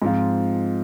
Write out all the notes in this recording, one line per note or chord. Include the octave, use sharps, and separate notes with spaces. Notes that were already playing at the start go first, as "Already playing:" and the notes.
G#2 F3 C4 F4